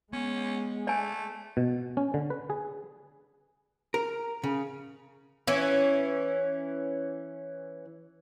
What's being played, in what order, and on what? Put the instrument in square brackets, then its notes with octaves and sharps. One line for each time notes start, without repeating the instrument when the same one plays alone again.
[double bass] G#3 [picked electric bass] B3 [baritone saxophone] C#4
[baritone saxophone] A3 [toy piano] D5 G#5
[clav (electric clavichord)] B2
C#4
D3
B4
G#4
[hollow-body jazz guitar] A#4
C#3
[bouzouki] E3 C#4